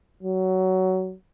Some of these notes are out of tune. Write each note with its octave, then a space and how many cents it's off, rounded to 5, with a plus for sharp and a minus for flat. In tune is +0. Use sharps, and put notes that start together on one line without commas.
F#3 +15